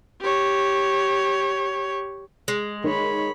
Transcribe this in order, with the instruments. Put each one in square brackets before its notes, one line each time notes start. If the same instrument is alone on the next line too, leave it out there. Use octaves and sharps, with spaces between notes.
[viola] G4 C#5
[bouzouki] G#3
[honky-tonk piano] D#3 [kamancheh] C#5 B5